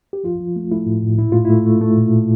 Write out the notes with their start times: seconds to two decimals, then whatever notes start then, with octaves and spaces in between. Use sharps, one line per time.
0.13 G4
0.24 F3 F4
0.40 F3
0.56 A3
0.71 A3 E4
0.86 A2
1.03 A2
1.18 A#2 E4
1.32 A3 F4
1.45 A3 E4
1.66 A3
1.81 A3
1.97 A#2